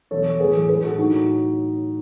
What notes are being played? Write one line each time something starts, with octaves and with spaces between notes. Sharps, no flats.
E2 B2 F#3 A4 C#5
A2 E3 G#4 B4
A2 F#3 G#4 B4
F#4 A4
A2 F#3 D#4 F#4